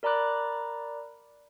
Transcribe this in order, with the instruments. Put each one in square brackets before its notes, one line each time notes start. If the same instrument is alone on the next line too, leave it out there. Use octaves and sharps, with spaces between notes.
[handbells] A#4 D5 A#5 B5 D6 F#6